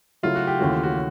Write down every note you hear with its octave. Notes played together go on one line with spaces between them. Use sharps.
C#3 F#3 A3 C#4 E4 F4
F#4
G4
D#2 C#3 E3 A3 C#4 F#4
F#4